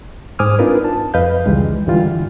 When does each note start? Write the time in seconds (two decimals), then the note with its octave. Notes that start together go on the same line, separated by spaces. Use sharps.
0.39 G#2 C5 G#5 D6 D#6 F6
0.59 C4 D4 D#4 F4 A#4 B4
0.84 A5
1.14 F2 B4 D#5 F5 G6
1.46 C#2 D#3 E3 G3 G#3
1.86 G2 D3 E3 G3 F4